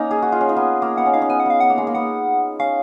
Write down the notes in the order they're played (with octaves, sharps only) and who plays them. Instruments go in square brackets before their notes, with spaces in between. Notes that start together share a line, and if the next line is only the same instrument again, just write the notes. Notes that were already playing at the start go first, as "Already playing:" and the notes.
Already playing: [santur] A#3 C#4 D#4
G#4
F#4
F4
C#4
D#4
B3
A#3
[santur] B3 [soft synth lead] F#5
[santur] C#4
[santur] D#4 [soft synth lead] F5
[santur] C#4
[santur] B3 [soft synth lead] G#5
[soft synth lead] F#5
[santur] B3 [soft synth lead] F5
[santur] B3 [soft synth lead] F#5
[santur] A#3
G#3
A#3
[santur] B3 [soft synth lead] F#5
[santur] C#4 [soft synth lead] F5